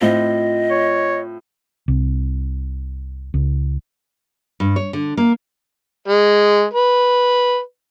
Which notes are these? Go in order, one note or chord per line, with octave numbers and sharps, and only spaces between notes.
A2 C4 F4 D#5
C#5
C2
C#2
G2
C#5
D3
A#3
G#3
B4